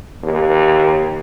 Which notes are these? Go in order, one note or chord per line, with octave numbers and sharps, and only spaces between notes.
D#2